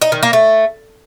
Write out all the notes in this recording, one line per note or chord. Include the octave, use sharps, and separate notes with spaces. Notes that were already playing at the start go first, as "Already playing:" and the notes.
D#4
D#3
A#3
A3